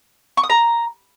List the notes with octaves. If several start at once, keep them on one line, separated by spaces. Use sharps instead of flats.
C#6
D#6
A#5